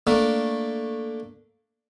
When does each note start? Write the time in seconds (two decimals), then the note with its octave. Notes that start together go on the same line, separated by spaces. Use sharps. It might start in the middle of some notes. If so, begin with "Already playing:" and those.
0.07 A3 A#3 D4